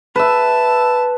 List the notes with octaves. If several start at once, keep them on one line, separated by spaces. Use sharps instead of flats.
B4 E5 A5